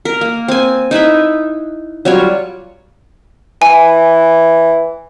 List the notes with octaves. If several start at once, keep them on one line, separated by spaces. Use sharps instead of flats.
A#4
A#3
C4 G#5
D#4 E4 B4 E5
F#3 G3 F4 C#5
E3 G#5